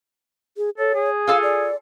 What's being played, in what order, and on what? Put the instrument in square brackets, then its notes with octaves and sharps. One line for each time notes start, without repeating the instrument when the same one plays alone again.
[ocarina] G#4
[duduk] A4 [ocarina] C#5
[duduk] G#4
[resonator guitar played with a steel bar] F4 A4 G#5 [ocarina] F5
[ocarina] D5